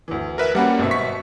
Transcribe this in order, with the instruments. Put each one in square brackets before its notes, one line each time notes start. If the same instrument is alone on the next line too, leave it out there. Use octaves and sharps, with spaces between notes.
[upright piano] D2 E3
[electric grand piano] A#4 B4 E5
[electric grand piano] G3 A#3 C#4 [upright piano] F#4 F#5 B5
[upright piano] G#1 B2 E5
[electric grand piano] C#6 B6